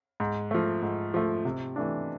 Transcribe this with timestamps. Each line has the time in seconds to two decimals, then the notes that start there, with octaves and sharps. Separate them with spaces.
0.20 G#2
0.51 F3 A3
0.82 G#2
1.14 F3 A3
1.45 C3
1.76 E3 A3 D4